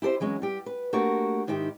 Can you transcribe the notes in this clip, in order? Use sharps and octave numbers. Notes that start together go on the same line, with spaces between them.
E4 G4 A4 C5 D#5
E3 F#3 G#3 C#4
G3 G4
B4
A3 A#3 D4 F#4 G4 A#4
G#2 D#3 D#4 E4 G4